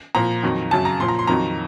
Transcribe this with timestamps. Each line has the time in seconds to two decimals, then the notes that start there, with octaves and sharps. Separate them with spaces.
0.15 A#2 F3 A#5
0.43 F2 D#3 F#3
0.71 F#2 C#3 F#3 A5
0.85 A#5
1.00 A#2 F3 C6
1.08 A#5
1.19 C6
1.27 F2 D#3 F#3 A#5